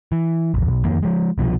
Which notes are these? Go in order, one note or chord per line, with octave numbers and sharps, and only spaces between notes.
E3
A#1 E2
B1
F2 D#3 A#3
F3 G#3
C2 B2 E3 F3